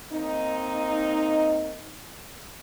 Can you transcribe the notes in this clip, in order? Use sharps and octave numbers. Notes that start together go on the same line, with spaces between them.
A#3 C4 D#4